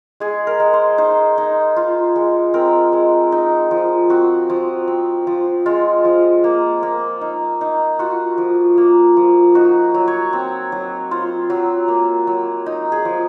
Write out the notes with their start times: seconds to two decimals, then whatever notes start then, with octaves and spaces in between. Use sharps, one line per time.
0.20 G#3 G#4
0.47 A#4
0.60 G#3
0.73 C5
0.98 D#4 C5
1.38 D#4
1.76 F4
2.16 G#3
2.54 C4 A#4
2.93 G#3
3.32 D#4
3.71 F3
4.10 C4 F#4
4.50 F3
4.88 C4
5.27 F3
5.66 G#3 F4
6.05 F3
6.44 A#3
6.83 A#3
7.21 D#4
7.61 D#4
7.99 F4 F#4
8.38 F3
8.78 A#3
9.17 F3
9.55 D#4 F#4
9.94 F#3
10.08 C#5
10.33 C4
10.72 F#3
11.11 F4 C5
11.50 F#3
11.88 A#3
12.27 F#3
12.66 D#4
12.92 G#4
13.05 F3